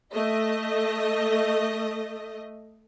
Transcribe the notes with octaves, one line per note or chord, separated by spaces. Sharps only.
A3 D#5